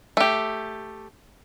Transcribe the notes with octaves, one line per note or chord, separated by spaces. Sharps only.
A3 G4